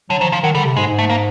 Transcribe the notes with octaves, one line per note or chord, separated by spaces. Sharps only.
D3 F#3
D#3 F3
F3
D#3 F#3
D3 G3
C3
G#2 G#3
G#2
A3
A#3